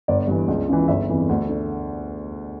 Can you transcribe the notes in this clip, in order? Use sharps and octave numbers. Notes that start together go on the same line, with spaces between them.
G1 D5
G2 E3
C#2
C#3 E3
G1 E5
F2 E3
D2
D3